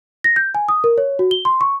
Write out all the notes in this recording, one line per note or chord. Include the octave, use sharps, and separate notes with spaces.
A#6
G6
G#5
D#6
A#4
C#5
F#4
G7
C6
C#6